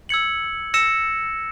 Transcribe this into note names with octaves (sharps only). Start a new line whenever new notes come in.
E6 G#6 C#7 F#7
E6 A#6 C#7 E7